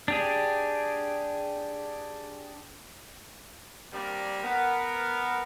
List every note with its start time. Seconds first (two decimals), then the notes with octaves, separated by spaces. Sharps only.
0.08 D4 G4 G#4
3.92 G3 A#3 C4 D4 A#4 D5
4.43 B3 A#4